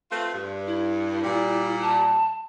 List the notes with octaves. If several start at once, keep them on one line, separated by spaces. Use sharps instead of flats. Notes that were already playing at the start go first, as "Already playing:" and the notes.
A3 C4 F4 B4
G2
E4
A#2 G3
A5